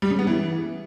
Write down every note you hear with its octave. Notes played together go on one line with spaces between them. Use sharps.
G3
C#3
B3
E3